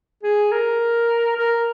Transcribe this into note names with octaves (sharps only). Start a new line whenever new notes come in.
G#4
A#4
A#4